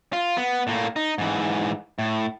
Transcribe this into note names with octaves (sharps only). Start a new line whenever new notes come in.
F4
B3
A2 A#3
D#4
G#2 E3
A2